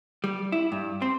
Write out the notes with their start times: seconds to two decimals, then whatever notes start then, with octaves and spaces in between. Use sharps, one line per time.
0.24 G3
0.52 E4
0.72 G2
1.02 C4